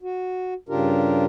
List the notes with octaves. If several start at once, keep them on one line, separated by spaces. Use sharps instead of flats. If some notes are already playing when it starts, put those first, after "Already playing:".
F#4
G2 C#3 D4 F4 G4 A#4